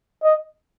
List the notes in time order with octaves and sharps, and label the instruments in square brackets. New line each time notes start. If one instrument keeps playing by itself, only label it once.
[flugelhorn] D#5